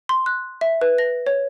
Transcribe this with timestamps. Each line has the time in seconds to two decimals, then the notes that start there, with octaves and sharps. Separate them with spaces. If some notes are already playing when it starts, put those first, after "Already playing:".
0.09 C6
0.26 F#6
0.61 E5
0.81 B4
0.98 A#6
1.26 C#5